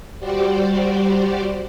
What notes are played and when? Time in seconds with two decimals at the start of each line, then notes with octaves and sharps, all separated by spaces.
0.19 G3 F#4 G4 C5 D5